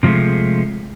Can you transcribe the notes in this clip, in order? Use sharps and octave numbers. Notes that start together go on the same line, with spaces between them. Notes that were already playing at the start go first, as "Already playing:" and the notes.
C3 F3 F#3 G#3 A3